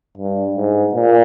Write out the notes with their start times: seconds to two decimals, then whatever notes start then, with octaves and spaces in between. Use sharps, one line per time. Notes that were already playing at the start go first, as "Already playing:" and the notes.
0.17 G2
0.56 G#2
0.94 A#2